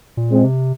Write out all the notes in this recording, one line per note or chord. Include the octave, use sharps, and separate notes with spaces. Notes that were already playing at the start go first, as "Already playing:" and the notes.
A#2
G#3 C4
C3